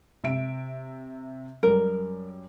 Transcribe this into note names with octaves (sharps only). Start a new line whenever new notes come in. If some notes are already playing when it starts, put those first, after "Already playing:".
C3 E5 D7
F#2 G3 A#4